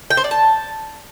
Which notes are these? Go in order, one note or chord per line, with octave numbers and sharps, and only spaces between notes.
G5
C5
D5
A5